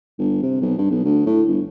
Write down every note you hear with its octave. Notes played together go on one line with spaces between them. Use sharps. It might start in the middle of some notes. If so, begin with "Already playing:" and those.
G1
C3
B1
G2
B1
D2
A2
G1